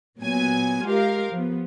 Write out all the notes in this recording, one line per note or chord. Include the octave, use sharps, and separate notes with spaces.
A#2 F#3 B3 G#5
G#3 F4 G4 A#4 F5
F3 B3